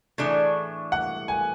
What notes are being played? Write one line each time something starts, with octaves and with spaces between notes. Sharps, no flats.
A2 E3 A3 D4 G#4
F#5
G#5